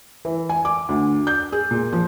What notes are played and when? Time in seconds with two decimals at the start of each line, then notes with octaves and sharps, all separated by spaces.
0.25 E3
0.49 G#5
0.65 D6
0.89 D2
1.27 G6
1.52 G#4
1.71 A#2
1.93 F3